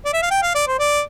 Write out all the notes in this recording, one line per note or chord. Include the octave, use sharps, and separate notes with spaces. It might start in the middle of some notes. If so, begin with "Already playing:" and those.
D5
E5
F5
G5
F5
D5
C5
D5